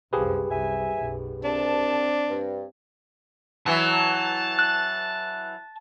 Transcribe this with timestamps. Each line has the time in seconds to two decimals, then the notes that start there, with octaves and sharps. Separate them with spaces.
0.13 C2 F#2 F3 G4 G#4 B4
0.51 C2 E5 G#5
0.98 B1 F#2
1.44 C2 C4 D4 A5
2.30 G2
3.66 E3 F#3 A5
4.59 F#6